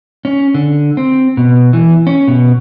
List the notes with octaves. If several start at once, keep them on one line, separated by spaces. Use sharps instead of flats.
C#4
D3
C4
B2
E3
C#4
B2